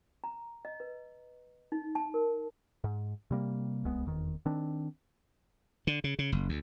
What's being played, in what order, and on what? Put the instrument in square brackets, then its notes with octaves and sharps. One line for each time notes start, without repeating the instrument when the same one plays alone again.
[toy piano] A#5
D#5
B4
D#4
A5
A#4
[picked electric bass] G#2
C3 G3 A#3
D1 C2 G#3 B3
F1 E2 D#3
D#3 C4 D4
[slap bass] D3
C#3
C#3
F#1
D2